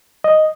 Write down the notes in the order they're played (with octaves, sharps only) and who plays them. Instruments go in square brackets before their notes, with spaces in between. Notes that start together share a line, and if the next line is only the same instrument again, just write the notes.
[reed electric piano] D#5